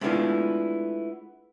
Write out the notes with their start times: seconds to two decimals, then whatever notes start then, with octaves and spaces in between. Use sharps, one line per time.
0.01 G#3 A3 B3 D4 E4 F4